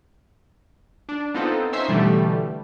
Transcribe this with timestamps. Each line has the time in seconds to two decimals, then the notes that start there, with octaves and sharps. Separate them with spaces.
1.09 D4
1.34 B3 C4 D#4 F4 A4 C5
1.73 C#4 D#4 C5 E5 C6
1.88 B2 D3 E3 G3 A3